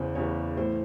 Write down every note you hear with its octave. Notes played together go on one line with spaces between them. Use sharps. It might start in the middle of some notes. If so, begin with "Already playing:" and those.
Already playing: E2 C#3 E3 C5
E2 C#3 E3 C#5
A2 E3 C5